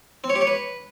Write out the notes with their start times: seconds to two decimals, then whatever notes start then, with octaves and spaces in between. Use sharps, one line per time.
0.24 C4
0.30 C#5
0.35 G4
0.41 C#5
0.47 B4